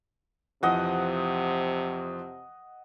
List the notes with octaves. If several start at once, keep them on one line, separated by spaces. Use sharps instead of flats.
F2 C3 E3 F3 D#5 F#5